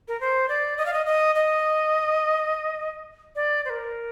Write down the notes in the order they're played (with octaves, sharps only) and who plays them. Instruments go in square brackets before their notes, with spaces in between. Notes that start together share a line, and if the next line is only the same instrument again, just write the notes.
[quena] A#4
C5
D5
D#5
F5
D#5
D#5
D#5
D5
C5
A#4